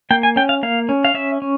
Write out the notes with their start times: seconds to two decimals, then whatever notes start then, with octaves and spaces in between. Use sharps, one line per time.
0.11 A#3 G5
0.23 G#5
0.36 C#4 G5
0.49 F5
0.63 A#3 F5
0.89 C#4
1.05 F5
1.14 C#4 E5
1.42 C#4